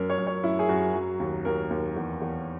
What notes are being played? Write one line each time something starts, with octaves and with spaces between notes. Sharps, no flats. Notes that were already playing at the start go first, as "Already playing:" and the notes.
Already playing: F#2 A#4
C#5
F#2
C#5
F#2 E4
G#4
F#2 F#4
F#3
D#2
D#2 A#4
D#2
E2
E2